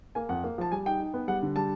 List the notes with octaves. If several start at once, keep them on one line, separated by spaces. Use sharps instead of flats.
A#3 G#5
F2 F#5
A#3
F3 A5
G3 G#5
D#4 G5
D#4
B3
G3 F#5
D3
G3 A5